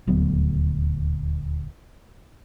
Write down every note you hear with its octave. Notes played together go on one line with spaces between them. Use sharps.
D#1 D2 F#3 B3